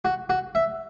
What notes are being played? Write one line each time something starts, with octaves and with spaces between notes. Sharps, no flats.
F#4
F#4
E5